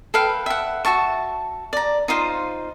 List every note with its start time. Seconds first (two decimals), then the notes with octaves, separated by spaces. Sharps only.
0.14 A4 B4 F5 G5
0.46 E5 F#5
0.85 F#4 E5 A5 C#6
1.73 D5 A#5
2.08 D#4 F4 C5 F5